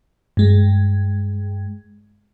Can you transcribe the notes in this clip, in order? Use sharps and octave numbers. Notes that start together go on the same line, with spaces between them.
G2 G#3